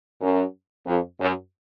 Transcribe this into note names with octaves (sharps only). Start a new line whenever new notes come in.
F#2
F2
F#2